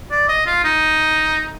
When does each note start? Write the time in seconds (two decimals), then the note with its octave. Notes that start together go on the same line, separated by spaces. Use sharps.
0.11 D5
0.29 D#5
0.46 F4
0.64 D#4